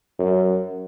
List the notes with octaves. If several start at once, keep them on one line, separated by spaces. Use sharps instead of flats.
F#2